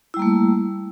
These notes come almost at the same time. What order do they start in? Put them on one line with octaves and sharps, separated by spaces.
E4 G3 A#3 A3